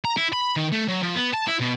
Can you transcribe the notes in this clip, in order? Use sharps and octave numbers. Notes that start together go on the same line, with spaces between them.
A#5
E4
B5
D#3
A3
F#3
F3
B3
A5
E4
B2